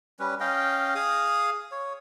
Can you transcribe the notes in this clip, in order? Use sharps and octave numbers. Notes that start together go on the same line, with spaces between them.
G3 C#4 B4
C#4 D#5 F5 G5
G#4 F5 D#6
C#5